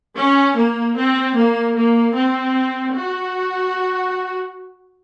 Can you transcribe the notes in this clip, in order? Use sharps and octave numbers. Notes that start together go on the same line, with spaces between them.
C#4
A#3
C4
A#3
A#3
C4
F#4